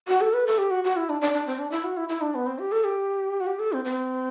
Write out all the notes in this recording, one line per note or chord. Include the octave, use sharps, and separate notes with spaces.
F#4
A4
B4
A4
G4
F#4
F#4
E4
D4
D4
D4
C4
D4
E4
F#4
E4
E4
D4
B3
C4
G4
A4
G4
F#4
G4
A4
C4
C4